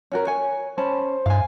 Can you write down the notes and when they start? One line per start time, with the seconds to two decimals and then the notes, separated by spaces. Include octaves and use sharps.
0.12 C#4 F#4 A#4
0.27 C#5 G#5
0.78 C#4 C5 A5 B5
1.26 G2 F5 G#5